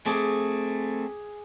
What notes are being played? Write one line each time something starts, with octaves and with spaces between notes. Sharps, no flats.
A3 C4 G#4 D6